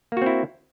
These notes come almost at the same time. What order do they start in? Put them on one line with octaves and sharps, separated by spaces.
A#3 F#4 C4 E4